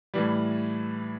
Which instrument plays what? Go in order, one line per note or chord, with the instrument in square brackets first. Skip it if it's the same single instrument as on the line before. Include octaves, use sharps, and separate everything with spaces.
[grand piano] A2 E3 G3